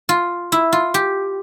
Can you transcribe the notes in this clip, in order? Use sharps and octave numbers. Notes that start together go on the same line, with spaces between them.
F4
E4
F4
G4